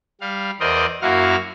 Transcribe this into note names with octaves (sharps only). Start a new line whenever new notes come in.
G3 F5
E2 A#4 C5 D5 D#5
F#2 A#3 E4 F#4 F5 F6